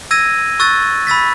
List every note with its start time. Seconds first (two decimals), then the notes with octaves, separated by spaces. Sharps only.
0.11 E6 G#6 A#6 D#7
0.60 C#6 E6 F#6 A6
1.07 B5 E6 A6 B6